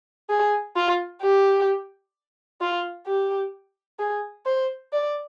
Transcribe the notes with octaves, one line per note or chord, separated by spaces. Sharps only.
G#4
F4
G4
F4
G4
G#4
C5
D5